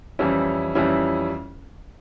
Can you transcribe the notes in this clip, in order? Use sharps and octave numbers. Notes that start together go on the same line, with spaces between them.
F2 E3 G3 C#4 E4
F2 E3 G3 C#4 E4